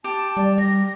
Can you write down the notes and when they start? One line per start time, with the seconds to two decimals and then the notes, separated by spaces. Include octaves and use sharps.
0.04 G4 A5
0.37 G3 D5
0.58 G3 A#6